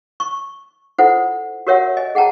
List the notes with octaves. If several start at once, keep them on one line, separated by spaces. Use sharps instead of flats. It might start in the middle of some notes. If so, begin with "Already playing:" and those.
C#6
E4 F4 A4 C5 F#5
F#4 G4 A#4 C#5 E5 F#5
D#5 G#5
G#4 F#5 G5 A5 A#5